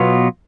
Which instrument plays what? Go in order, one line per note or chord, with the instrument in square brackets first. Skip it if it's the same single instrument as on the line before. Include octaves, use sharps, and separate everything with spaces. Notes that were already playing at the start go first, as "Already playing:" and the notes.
Already playing: [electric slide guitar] B2 F#3 B3 F4